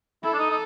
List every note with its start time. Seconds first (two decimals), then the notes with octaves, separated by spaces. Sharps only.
0.23 E4 A4
0.33 D4
0.39 D#4
0.50 D#4